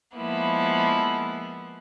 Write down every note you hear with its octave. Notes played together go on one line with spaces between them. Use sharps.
F3 G#3 A#3 B3 E4